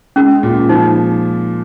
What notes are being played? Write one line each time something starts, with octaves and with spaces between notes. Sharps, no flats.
G#3 C#4
A#2
F3 D#4